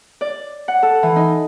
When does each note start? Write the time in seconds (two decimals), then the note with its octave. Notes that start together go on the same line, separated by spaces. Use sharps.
0.21 D5
0.68 F#5
0.83 A4
1.03 E3
1.16 D#4